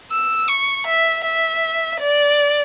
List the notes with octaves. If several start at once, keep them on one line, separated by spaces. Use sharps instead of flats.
E6
C#6
E5
E5
D5